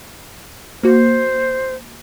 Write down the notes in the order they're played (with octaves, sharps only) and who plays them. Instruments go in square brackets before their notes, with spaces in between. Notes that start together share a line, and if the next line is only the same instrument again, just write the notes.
[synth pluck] A#3 F#4 [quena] C5